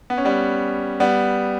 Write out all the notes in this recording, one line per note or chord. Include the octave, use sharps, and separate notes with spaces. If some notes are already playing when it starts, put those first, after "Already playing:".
B3
C#4
G3 B3
G3 B3